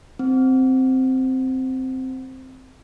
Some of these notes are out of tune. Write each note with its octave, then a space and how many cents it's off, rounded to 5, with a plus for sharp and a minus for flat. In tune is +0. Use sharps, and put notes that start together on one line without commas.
C4 -5